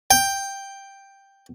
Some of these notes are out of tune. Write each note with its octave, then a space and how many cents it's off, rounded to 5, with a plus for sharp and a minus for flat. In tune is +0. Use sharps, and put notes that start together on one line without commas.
G5 +5